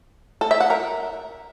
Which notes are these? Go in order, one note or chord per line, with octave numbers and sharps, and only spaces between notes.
A4
E5
F#5
A#4